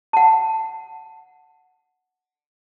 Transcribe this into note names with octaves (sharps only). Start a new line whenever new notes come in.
F#5 A5